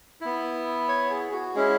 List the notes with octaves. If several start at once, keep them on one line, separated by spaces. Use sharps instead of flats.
B3 E4
C#5
G#4
F#4
G#3 C#4 E4 G#4